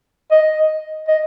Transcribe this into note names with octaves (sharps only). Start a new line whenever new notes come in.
D#5
D#5